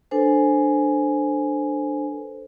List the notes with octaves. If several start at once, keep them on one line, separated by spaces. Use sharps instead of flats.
D4 A4 B4 C5 G#5